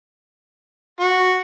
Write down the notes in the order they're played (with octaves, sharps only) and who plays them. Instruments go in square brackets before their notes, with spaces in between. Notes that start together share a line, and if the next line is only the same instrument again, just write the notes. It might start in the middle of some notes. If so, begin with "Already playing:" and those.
[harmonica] F#4